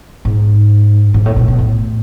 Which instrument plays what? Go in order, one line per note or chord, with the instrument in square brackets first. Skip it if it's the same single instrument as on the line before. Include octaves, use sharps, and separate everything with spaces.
[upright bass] G#2
G#2
A2
B2
B2
A2